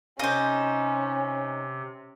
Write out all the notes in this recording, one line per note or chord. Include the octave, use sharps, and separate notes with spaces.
C3 C#4 D#4 C5